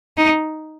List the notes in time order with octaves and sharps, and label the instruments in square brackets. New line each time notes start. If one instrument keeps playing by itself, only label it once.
[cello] D#4